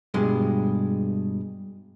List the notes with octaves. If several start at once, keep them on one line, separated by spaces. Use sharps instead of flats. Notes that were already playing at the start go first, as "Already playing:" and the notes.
G2 B2 G#3